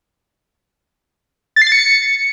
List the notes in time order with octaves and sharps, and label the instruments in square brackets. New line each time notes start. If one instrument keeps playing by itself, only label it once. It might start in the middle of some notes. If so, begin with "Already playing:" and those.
[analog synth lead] A6
C7
A6
C#7